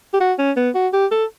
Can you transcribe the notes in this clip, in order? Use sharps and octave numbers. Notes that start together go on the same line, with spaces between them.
G4
F#4
C#4
B3
F#4
G4
A4